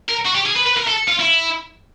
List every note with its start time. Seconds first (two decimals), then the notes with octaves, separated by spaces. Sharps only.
0.09 A#4
0.25 F#4
0.35 G4
0.46 G#4
0.56 B4
0.66 B4
0.77 A#4
0.88 A4
1.08 F4
1.20 E4